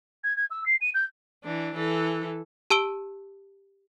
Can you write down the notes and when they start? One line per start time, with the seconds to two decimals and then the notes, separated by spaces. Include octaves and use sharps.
0.24 G#6
0.37 G#6
0.51 E6
0.66 C7
0.81 D#7
0.94 G6
1.44 E3 D4
1.75 E3 A4
2.70 G4 A5 E6 D7 G7